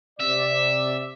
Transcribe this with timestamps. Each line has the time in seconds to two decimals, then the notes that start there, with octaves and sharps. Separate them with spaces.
0.20 C3 D5 E5